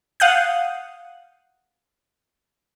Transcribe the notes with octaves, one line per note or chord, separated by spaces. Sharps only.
F5 F#5 D#6 F#6 G6